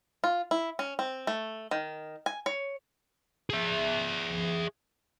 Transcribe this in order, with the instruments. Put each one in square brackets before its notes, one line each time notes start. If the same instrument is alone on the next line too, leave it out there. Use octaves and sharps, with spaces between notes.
[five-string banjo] F4
E4
C#4
C4
A3
D#3
G#5
C#5
[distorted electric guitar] G#4 E5